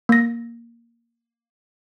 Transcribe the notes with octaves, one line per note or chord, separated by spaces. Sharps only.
A#3 A#6